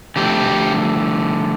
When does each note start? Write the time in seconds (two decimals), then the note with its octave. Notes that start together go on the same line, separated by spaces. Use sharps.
0.16 D3 F3 A3 G4